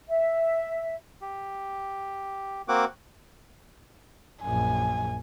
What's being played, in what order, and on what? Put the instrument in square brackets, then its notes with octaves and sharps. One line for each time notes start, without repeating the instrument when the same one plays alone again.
[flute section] E5
[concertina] G4
A#3 C4 F#4 F#5 D6
[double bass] A#1 F#2 [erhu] G#5